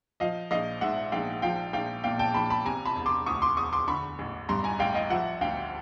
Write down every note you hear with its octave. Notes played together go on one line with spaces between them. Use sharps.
F3 D#5 F5
A#1 D#5 F5
G#2 E5 F#5
A#1 F5 G5
F3 F5 G5
A#1 F5 G5
A#2 F5 G5
G5 A5
A#1 A5 B5
A5 B5
C3 G#5 A#5
A5 B5
E1
C6 D6
D2 C#6 D#6
C6 D6
E1 C#6 D#6
C6 D6
D3 B5 C#6
A1
G2 A#5 C6
G#5 A#5
A1 F5 G5
D#5 F5
F3 E5 F#5
D2 F5 G5